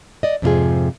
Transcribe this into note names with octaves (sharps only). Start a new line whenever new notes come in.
D5 D#5
F2 G#2 C3 D#4 F4 G#4